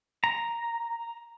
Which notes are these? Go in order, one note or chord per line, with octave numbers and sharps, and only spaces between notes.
A#5